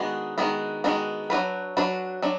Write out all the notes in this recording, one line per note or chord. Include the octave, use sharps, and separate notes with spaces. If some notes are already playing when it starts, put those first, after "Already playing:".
Already playing: D#3 G#3 B3 D4 F#4
D#3 G#3 B3 D4 F#4
D#3 G#3 B3 D4 F#4
F#3 D4 F#4 B4
F#3 D4 F#4 B4
F#3 D4